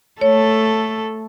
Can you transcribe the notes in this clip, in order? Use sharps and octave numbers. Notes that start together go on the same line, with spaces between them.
A3 A4 C#5